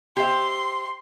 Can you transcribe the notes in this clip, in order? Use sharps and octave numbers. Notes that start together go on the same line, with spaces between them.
G4 C5 E5 C6